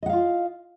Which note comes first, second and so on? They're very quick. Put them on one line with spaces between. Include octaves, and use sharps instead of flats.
D#5 F#5 F5 F4